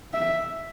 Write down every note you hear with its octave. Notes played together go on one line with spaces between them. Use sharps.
E5